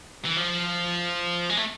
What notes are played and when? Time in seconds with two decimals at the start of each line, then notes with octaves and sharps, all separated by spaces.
0.25 E3
0.36 F3
1.49 G#3
1.57 A3